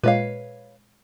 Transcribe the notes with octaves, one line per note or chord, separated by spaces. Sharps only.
A#2 G#3 B4 C#5 F5